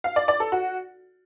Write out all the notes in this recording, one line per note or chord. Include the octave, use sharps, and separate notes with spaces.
F5
D5
D5
A4
F#4